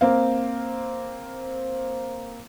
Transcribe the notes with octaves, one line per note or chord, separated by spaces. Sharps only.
A#3 C4 F5